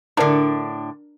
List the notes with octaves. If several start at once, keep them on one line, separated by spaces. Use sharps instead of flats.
A2 D3 D4 A#4